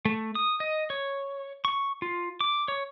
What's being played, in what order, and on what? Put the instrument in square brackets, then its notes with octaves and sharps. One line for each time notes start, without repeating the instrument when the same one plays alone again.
[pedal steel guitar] A3
D#6
D#5
C#5
C#6
F4
D6
C#5